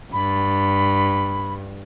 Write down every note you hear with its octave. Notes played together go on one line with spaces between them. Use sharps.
G2 B5